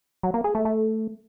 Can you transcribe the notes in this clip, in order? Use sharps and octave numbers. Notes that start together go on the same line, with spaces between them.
F#3
A#3
G#4
A3
A3